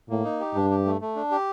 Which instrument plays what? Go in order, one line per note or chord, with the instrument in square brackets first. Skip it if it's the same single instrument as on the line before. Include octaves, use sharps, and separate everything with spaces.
[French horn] A2 [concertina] A#3
[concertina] D#4
G4
[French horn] G2 [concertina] D4
[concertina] G4
A3
A3
D4
G4